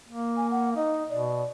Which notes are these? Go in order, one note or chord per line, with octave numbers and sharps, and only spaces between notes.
A#3
G#5
F#5
D#4 D#5
B2 D5